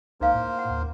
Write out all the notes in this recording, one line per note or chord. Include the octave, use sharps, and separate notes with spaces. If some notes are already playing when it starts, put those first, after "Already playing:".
C#2 A#3 D#4 A#4 C5 F5
A2
F#5
D#2